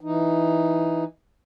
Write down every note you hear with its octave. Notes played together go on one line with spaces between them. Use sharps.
E3 D#4